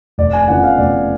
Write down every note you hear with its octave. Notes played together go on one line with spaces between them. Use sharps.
F1 D5
G#5
F2 C#3 F3 B3 F#5
F5
F1 D5